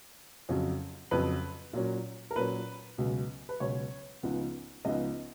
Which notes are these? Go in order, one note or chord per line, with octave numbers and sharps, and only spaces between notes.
F2 C#3 F#3
F2 C#3 F#3 B4
A#2 F#3 C#4
A#4
A#2 F#3 C#4 B4
C#2 B2 F#3
B4
C#2 B2 F#3 C#5
C#2 C#3 F3 B3 D#4
C#2 C#3 F3 B3 D#4 D#5